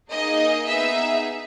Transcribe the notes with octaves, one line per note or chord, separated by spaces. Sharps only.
A#3 D#4 G#4 D#5
B3 D#4 G#4 E5